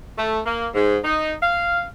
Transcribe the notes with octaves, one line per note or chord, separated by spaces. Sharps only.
A3
A#3
G#2
D#4
F5